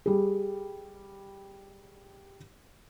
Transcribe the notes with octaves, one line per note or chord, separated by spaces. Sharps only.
G3 G#4